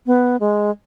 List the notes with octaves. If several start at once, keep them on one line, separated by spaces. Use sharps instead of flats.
B3
G#3